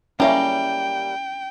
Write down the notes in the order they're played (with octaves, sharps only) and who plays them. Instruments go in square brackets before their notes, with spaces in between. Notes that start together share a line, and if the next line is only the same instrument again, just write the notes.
[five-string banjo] G3 A#3 [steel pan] C#4 [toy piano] E4 E5 [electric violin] G5